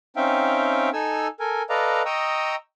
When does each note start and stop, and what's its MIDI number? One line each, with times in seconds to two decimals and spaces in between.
0.16 0.90 60
0.16 0.90 61
0.16 0.90 63
0.16 0.90 76
0.16 0.90 77
0.16 0.90 79
0.93 1.28 63
0.93 1.28 69
0.93 1.28 80
0.93 1.28 88
1.40 1.63 69
1.40 1.63 70
1.40 1.63 80
1.70 2.02 69
1.70 2.02 71
1.70 2.02 74
1.70 2.02 75
1.70 2.02 77
1.70 2.02 82
2.06 2.55 75
2.06 2.55 79
2.06 2.55 82
2.06 2.55 85
2.06 2.55 87
2.06 2.55 88